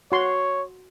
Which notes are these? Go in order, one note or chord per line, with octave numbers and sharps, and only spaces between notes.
F#4 C#5 C6